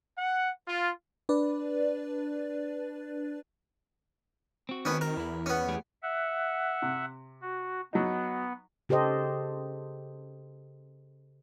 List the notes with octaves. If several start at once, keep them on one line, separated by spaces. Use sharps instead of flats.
F#5
F4
D4 B4 D5
C4 F#4
D#3 B3 C#4
A#4
E2 E3 E4
B3 C#4
A3 G4 G#4
E5 F#5
C3
F#4
F#3 B3 D#4
C#3 G4 A4 C5 D#5